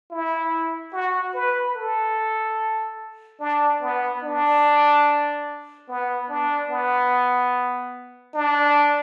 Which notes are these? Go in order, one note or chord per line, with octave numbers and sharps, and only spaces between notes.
E4
F#4
B4
A4
D4
B3
D4
B3
D4
B3
D4